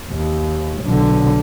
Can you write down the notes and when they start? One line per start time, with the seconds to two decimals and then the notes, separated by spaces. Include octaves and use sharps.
0.11 D#2
0.82 B1 D3